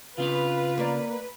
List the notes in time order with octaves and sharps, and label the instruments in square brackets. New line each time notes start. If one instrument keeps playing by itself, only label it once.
[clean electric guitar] C#3 C4 F5 [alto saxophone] F4 [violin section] B4
[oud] A#3 D5